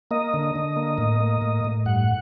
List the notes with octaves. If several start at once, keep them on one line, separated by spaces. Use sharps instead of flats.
A#3 D#5
D3
D3
A#3
A2
A#3
A2
A2
G2 F#5